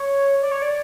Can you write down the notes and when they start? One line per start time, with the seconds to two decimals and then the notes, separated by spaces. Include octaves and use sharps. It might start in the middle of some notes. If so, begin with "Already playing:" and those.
Already playing: C#5
0.42 D5
0.52 C#5
0.62 D5